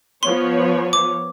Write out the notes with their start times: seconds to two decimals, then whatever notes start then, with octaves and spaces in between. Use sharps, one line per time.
0.23 F3 B3 C#5 C6
0.93 D6